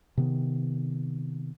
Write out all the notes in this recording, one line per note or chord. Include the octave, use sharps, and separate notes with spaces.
C3 D#3 B3